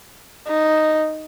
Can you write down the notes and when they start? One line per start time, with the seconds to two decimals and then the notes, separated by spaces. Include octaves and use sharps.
0.47 D#4